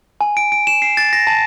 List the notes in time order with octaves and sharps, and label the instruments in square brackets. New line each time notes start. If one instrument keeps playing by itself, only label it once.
[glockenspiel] G#5
D7
D7
E7
C7
A6
A#6
A5